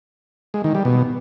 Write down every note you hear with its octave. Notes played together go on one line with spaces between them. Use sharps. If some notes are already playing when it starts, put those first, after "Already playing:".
G#3
D#3
G3
B2